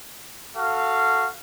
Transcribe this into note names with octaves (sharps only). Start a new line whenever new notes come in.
F#4 A4 F5